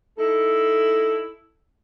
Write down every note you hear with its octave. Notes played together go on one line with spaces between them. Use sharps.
D#4 E4 A4